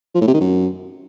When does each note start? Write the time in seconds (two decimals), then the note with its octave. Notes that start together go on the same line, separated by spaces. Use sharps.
0.15 F3
0.21 A2
0.28 C3
0.34 D#3
0.41 F#2